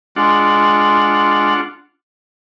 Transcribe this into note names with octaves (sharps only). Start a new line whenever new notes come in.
G#3 D4 F4 F#5